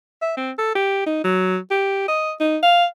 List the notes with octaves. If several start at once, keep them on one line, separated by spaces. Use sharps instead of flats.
E5
C4
A4
G4
D#4
F#3
G4
D#5
D#4
F5